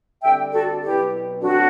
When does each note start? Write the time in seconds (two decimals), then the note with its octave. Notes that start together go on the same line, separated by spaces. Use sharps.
0.23 D3 G3 C4 E5 G5
0.53 F#4 A4
0.82 B2 F#3 C4 E4 G4
1.42 D3 F#3 C4 D4 F#4